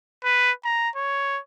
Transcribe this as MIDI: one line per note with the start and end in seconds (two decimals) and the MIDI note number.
0.24 0.51 71
0.65 0.89 82
0.96 1.39 73